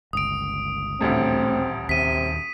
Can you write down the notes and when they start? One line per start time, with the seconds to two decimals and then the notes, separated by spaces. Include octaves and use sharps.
0.13 G1 C#2 D#6 D7
1.01 D#1 A1 D2 A3 C4
1.89 D#2 C3 B6 D#7